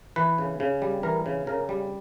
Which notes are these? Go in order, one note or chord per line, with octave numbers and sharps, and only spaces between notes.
E3 B4
C#3
C#3
G3
E3 A#4
C#3
C#3 A#4
G3